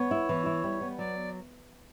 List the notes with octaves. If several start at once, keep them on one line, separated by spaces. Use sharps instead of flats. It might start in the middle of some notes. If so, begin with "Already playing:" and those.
Already playing: B3 C#5
E4
E3
E4
G3
B3
F#3 D5